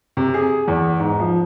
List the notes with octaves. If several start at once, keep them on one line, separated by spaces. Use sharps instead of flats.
C3
G#4
E2
G#2
F3